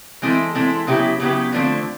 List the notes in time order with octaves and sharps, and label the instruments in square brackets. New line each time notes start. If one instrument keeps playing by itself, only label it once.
[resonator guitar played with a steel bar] E3 G#3 C4 E4 A4
E3 G#3 C4 E4 A4
C#3 F#3 B3 E4 G4
C#3 F#3 B3 E4 G4
D3 F3 A3 C4